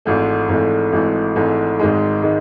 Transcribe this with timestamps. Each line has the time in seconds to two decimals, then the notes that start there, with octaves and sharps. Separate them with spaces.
0.05 G#1 G#2 E3 A3
0.49 G#1 G#2 E3 A3
0.92 G#1 G#2 E3 A3
1.36 G#1 G#2 E3 A3
1.79 G#1 G#2 D#3 G#3
2.23 D#3 G#3